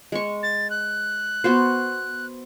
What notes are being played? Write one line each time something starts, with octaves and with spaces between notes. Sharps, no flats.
G#3 C#6
A6
F#6
B3 F#4 C5